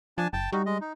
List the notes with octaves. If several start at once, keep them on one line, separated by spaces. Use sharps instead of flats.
F3 D4 G#5 A5
F#1 G5 A5
G3 D#4 F#4
G#3 D#5
D#4